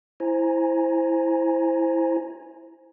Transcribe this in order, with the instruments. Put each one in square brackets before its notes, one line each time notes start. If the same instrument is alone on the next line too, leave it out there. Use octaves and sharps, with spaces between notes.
[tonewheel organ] E4 C5 G#5 A#5